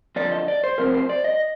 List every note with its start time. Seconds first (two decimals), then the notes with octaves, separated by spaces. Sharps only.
0.16 D#2 D3 F3 D5
0.32 D#5
0.48 D5
0.64 C5
0.78 C3 F3 C4 A#4
0.94 C5
1.09 D5
1.24 D#5